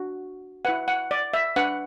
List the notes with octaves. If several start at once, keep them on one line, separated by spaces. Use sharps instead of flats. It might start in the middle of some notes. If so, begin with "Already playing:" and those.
Already playing: D4 F#4
E4 B4 F#5
F#5
D5
E5
D4 B4 F#5